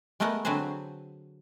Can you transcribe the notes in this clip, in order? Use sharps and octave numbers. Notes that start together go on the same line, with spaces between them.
G#3 A3 B3 A#4 D#5 F#5
D3 F#3 C4 G#4 B4 C5